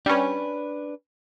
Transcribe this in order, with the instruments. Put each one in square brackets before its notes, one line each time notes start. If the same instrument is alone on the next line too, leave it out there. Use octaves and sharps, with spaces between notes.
[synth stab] G3 C#4 [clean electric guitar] D4 B4